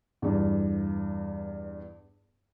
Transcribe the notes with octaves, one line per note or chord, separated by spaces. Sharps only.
E2 G2